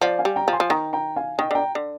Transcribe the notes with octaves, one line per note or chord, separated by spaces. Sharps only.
F3 D5 F5
F5 G#5
G3
G5 A#5
F3
G#5 C6
F3
D#3 G5 A#5
G5 A#5
F5 G#5
D#3 D#5 G5
D3 G5 A#5
D3